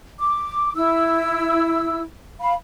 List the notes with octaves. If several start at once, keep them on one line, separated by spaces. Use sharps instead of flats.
D6
E4 E6
F5 B5